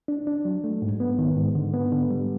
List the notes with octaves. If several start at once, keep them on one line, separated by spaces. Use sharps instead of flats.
D4
D4
F#3
A3
G#2
B3
D#3
G#2
D3
B3
D3
G3